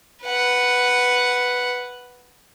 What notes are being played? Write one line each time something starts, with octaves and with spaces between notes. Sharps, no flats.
B4 F#5